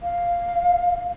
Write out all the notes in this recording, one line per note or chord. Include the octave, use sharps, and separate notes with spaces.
F5